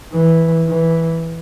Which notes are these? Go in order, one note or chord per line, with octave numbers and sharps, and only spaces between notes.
E3
E3